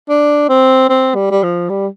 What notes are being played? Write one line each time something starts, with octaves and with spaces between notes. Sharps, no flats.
D4
C4
C4
G3
G3
F3
G3